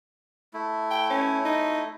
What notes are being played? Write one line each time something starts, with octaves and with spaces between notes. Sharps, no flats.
A3 E4
G5
C#4
D#4